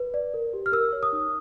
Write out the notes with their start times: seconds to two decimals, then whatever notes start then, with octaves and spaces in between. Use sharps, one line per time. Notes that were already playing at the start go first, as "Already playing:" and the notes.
Already playing: B4
0.14 D5
0.34 A#4
0.53 G4
0.66 F6
0.72 A#4 E6
0.93 C#5
1.03 D#6
1.13 D#4